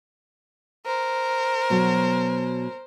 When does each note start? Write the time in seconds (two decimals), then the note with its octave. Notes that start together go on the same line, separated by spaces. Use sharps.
0.86 A#4 C5
1.70 B2 F#3